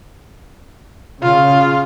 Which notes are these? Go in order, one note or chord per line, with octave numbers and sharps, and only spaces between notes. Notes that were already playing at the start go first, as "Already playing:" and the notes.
C#3 F4